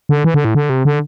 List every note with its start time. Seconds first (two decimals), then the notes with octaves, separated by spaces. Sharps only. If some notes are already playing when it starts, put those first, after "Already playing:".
0.09 D3
0.24 E3
0.34 D3
0.45 A2
0.55 D3
0.70 C3
0.85 D3